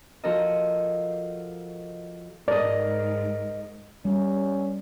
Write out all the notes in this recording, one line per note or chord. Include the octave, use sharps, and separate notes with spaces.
F3 F#4 A4 A#4 D#5
G#2 A#4 D5 D#5
G3 C#4